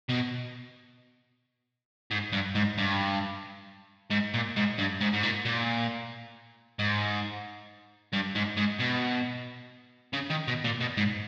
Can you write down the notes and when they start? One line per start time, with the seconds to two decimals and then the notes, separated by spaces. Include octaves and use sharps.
0.10 B2
2.11 G#2
2.32 G2
2.55 G#2
2.78 G2
4.11 G#2
4.34 A#2
4.56 G#2
4.78 G2
5.01 G#2
5.13 G#2
5.23 A#2
5.45 A#2
6.79 G#2
8.13 G2
8.35 G#2
8.57 G#2
8.80 B2
10.13 C#3
10.30 D#3
10.48 B2
10.64 A#2
10.80 B2
10.97 G#2